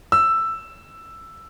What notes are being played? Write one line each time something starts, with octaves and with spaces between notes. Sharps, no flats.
E6